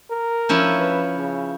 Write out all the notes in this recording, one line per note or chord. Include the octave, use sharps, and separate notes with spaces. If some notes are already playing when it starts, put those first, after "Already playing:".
A#4
F3 C#4 E4
B4
C#3